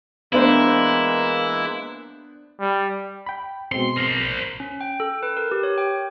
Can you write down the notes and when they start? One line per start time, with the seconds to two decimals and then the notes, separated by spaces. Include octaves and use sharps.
0.33 E3 G#3 A#3 B3 D4 E4 C5
2.60 G3
3.26 G5 B5
3.72 B2 G#3 C4 C6
3.97 A#4 C5
4.60 C#4
4.81 G5
5.00 A4
5.23 B4
5.37 A#4
5.51 G4
5.63 C#5
5.78 G5